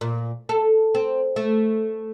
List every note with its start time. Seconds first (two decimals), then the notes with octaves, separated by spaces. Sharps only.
0.01 A#2
0.49 A4
0.95 C4
1.36 A3